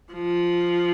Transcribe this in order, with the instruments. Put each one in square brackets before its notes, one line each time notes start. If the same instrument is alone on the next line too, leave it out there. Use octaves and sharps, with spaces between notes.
[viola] F3